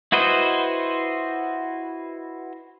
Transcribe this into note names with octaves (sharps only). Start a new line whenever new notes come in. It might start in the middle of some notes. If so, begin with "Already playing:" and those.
E4 F#4 B4 C5 D#5